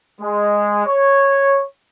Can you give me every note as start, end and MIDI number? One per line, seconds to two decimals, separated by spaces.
0.21 0.85 56
0.85 1.64 73